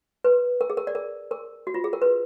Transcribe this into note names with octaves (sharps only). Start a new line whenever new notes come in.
B4
A#4
G#4
A#4
D5
A#4
A#4
F#4
F4
G#4
A#4
B4